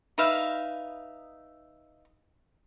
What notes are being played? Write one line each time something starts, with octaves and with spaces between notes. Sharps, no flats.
D#4 B4 E5 F5